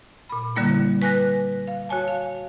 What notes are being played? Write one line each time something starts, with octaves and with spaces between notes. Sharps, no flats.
A#2 B5
D3 G3 A#3 E4
B4 G#5 F#6 A#6
F5
F#4 C#5 G#5 A5
F5